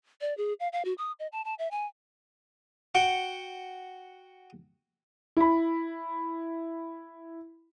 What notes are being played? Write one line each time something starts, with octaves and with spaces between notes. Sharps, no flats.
D5
G#4
F5
F5
F#4
D#6
D#5
A5
A5
E5
G#5
F#4 F#5 G5
E4 B5